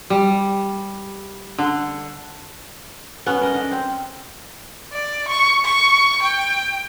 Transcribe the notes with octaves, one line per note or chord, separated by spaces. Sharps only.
G3
D3
B3 C#4
A#4 D#5
D3
C4
D5
C#6
C#6
G5